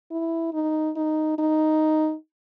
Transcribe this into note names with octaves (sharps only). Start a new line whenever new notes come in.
E4
D#4
D#4
D#4